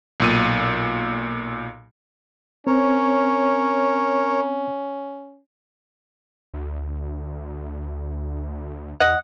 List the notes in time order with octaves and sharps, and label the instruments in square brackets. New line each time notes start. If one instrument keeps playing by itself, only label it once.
[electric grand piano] B1 A#2 D#7
[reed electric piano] C4 [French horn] C#4 [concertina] A#4 C#5
[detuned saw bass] D2
[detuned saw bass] E2 [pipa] D#5 F#5